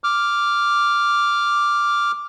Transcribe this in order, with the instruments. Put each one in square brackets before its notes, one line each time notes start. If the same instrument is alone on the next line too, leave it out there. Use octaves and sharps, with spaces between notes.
[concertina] D6 F6